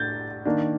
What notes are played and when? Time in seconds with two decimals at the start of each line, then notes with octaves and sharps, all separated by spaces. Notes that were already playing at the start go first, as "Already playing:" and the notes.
Already playing: A2 D4 G6 A6
0.45 D#3 A#3 D4